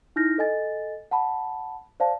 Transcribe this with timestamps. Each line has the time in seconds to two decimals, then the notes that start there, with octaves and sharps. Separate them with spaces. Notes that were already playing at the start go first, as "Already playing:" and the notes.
0.16 D#4 E4 F6 G6 A#6
0.38 A4 D#5 G#5 A6
1.11 F#5 A5 B5
2.00 C5 D5 F5 A5